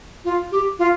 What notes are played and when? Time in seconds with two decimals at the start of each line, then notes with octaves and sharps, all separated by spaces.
0.25 F4
0.52 G4
0.79 F4